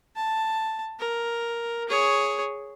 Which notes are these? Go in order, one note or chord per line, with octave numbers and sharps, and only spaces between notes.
A5
A#4
G#4 C#5